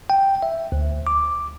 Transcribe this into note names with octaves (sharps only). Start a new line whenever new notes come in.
G5
E5
D2
D6